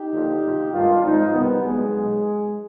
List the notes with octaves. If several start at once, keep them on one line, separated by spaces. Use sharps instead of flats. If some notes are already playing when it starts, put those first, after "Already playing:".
Already playing: D#4 G4
D#2 D3 F3
D2 C3 F3
G#1 G2 D#3 D4 F4
G#1 G#2 F3 C4 D#4
C2 C3 D#3 G3 B3
B1 B2 G#3
B1